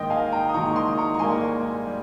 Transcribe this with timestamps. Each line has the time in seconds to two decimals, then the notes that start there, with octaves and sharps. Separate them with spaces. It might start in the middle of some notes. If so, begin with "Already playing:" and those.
Already playing: G#2 D#3 A#3 D#5 G5
0.10 F5 G#5
0.32 G5 A#5
0.49 D#6
0.54 G#2 D#3 A#3 A#5 C#6
0.66 C#6
0.76 C6 D#6
0.98 A#5 C#6
1.14 C#6
1.19 G#2 G3 A#3 G#5 C6
1.87 G3